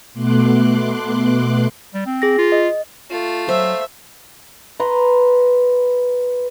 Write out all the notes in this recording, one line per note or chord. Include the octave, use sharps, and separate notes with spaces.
B2 A3 B3 C6 D6 F#6
G3
C4
G#4 A#6
F4
D#5
A3 F4 F5
F#3 C5 E5
B4 A#5 C6